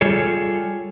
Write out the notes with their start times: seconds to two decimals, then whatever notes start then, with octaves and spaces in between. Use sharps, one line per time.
0.01 G3 F4 G#4 A4 C#5